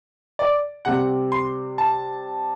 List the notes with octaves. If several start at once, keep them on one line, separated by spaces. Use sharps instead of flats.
D5
C3 G3 C4 F#5
C6
A5